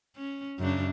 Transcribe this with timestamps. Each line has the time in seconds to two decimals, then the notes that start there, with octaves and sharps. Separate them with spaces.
0.16 C#4
0.59 F#2 C#3 D4